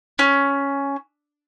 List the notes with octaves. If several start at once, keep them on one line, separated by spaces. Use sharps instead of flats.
C#4